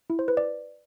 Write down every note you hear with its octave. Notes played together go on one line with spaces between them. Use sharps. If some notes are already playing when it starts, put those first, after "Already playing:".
E4
C5
B4
D5